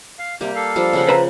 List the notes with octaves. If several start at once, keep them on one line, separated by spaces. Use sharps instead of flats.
F5
C3 G3 A#3 G4
A4 F5
F3 G3 D4
C#3 F3 F#5
B4 C5 A#5